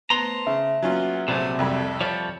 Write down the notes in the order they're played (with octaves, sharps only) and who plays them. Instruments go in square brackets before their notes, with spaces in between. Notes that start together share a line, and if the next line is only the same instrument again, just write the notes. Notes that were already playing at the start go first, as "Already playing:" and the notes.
[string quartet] A3 C5 A5 [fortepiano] B3 [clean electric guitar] A#5 C6
[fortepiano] C#3 [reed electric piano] E5
[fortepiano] F#3 C#4 F4 [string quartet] A#3 B3 G#4
[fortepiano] A#1 [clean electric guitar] C3 F#3 A3 [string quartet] E4 G#4 C5
[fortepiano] C2 F2 B5 [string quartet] C4 E4 A4
[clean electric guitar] F3 G3 [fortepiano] C#5